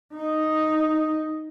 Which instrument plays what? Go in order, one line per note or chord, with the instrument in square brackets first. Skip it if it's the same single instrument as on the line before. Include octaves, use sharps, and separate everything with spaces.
[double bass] D#4